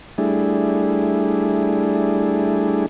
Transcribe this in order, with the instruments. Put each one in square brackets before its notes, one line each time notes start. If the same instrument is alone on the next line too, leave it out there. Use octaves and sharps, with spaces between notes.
[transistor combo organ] G3 A3 D4 E4 G#4